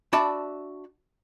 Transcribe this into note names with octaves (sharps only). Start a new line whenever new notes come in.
D4 F#4 D5 E5 A5 B5